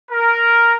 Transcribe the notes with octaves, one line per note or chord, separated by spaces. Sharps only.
A#4